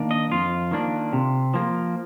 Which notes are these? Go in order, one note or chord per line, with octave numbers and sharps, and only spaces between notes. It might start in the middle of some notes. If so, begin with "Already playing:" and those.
Already playing: D#3 A#3 D4
D#5
F2 F4
D#3 A#3 D4
C3
F3 A#3